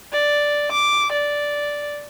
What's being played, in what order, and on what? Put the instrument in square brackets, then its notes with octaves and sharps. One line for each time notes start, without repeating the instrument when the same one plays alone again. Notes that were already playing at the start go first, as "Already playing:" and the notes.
[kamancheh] D5
D6
D5